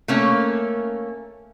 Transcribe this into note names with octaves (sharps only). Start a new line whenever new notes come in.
A3 A#3 C#4